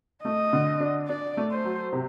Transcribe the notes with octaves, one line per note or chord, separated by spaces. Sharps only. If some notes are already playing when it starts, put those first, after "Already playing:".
A3 D#5
D3
D4
D4 D5
A3
C5
F#3
C3